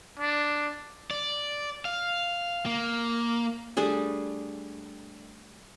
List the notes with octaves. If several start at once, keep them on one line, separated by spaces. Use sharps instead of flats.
D4
D5
F5
A#3
G3 A3 D4 G#4